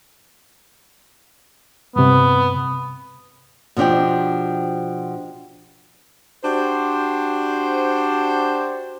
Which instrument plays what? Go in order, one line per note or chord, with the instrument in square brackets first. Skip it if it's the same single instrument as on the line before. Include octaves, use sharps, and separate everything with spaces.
[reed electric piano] G2 C3 [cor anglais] B3
[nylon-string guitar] B2 F3 D4 G4 G5
[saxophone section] D4 F#4 G4 C5